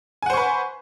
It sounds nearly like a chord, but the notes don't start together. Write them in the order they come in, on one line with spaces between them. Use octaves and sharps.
G#5 F#5 C5 C#6 B4